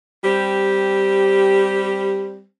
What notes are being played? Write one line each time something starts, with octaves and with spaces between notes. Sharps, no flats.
G3 C4 G4